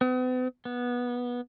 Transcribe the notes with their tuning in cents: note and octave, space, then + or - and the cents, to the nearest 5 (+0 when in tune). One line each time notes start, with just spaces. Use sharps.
B3 +45
B3 -15